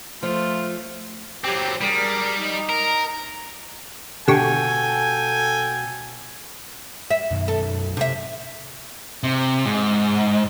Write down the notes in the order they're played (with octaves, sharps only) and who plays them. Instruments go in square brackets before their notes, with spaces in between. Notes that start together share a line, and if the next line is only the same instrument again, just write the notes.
[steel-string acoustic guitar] F3 [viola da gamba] A3 [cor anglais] F4
[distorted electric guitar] F#3 C4 [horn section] G4
[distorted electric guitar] G3 [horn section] D4 G#4 A#4
[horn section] D#4
[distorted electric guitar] A#4
[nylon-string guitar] B2 [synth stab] D3 G4 C#6 [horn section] A4 G5 G#5
[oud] E5
[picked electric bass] F#2 B2 D#3
[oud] A4
C3 E5
[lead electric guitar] C3
G#2